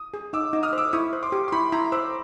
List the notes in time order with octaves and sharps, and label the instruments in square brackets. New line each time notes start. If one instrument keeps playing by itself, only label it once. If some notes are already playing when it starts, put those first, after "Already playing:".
Already playing: [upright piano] D#6
[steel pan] G#4
[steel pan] D#4 [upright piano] D6 E6
[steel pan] D#4
[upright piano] D#6 F6
[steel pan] C5 [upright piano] D6 E6
[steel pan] E4 [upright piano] C#6 D#6
[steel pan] C5
[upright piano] C6 D6
[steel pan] G4
[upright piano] C6
[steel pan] E4 [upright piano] B5 C#6
[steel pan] E4 [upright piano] A#5 C6
[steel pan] C5 [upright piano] D6 E6